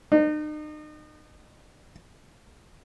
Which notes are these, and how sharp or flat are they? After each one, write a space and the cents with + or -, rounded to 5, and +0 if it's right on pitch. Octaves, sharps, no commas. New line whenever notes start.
D#4 -40